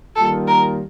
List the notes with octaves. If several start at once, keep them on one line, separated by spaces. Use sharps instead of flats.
D#3 G3 A#3 F4 A4
A#4